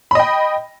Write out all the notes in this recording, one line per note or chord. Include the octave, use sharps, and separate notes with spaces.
D#5 G5 B5